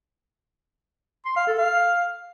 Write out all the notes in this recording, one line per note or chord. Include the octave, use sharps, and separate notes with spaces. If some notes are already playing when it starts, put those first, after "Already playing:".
C6
F5
A4
F5